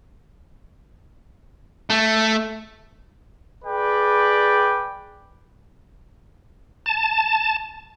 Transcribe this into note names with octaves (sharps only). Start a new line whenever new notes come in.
A3
G#4 B4 D5 G5
A5